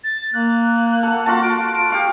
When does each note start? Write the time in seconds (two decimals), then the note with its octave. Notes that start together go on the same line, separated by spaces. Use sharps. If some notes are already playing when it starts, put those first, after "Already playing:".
0.04 A6
0.34 A#3 F#6
1.03 A4 F#5
1.26 F4 F#4 A5
1.43 D7
1.90 G4 F5 C#6